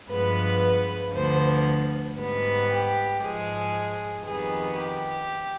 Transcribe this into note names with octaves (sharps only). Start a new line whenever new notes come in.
G2 F3 G#3 B3 B4
D2 D3 F3 B3 C5
G#2 G3 B3
G4
G#2 F3 G#3 G#4
F2 D#3 G3 B3 G#4
G4